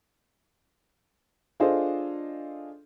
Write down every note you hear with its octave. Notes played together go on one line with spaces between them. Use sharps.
D4 F4 G#4 A4 C5 D#5